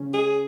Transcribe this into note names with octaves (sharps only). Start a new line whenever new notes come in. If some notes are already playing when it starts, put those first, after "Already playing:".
Already playing: C#3 C#4
G#4